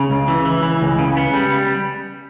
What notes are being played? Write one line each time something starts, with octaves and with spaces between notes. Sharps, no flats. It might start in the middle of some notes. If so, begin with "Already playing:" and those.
Already playing: C#3
C#2
E3
E3
E3
C#2
C#3
B3
G3